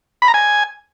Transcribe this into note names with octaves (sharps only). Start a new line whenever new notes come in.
B5
A#5
G#5